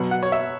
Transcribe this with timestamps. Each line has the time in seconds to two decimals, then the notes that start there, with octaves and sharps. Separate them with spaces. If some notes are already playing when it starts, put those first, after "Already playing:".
Already playing: B2 F#3 B3 F#5
0.11 F#5
0.23 C#5
0.32 E5